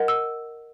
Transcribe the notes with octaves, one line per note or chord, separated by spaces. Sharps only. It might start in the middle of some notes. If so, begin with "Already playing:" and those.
Already playing: A#4 D#5 F#5
E6